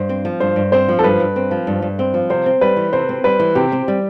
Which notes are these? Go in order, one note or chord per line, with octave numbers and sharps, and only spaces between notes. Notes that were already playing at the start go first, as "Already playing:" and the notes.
Already playing: G2 C5
C4
F3
G2 C5
G2
C4 C5
F3
A4
G2 B4
G2
C4
F3
G2
G2
C4
F3
C3 C5
C4
G3 B4
E3
C3 C5
C4
G3 B4
E3
C3 G4
C4
G3